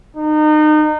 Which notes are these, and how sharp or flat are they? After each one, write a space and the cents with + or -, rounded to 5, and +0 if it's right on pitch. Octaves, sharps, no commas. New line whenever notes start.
D#4 -30